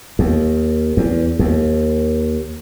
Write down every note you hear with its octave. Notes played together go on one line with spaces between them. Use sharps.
D#2
E2
D#2